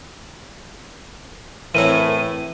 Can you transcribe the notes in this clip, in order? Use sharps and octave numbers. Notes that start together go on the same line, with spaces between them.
A2 E3 C4 E4 A#4 C#5 D#7